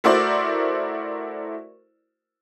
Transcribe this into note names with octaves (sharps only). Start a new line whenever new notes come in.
A3 E4 F#4 A#4 C5 D5